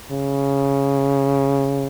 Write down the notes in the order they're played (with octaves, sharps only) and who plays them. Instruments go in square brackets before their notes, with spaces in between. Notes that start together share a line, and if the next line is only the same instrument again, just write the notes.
[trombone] C#3